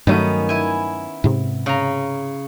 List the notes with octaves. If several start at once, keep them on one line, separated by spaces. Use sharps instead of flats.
G2 D#3 F#3 A3 B3 C#4
E4 G#5
G#2 C3
C#3 A#5